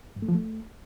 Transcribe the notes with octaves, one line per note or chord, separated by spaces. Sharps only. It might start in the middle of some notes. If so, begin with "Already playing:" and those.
G2
A3
F3
A3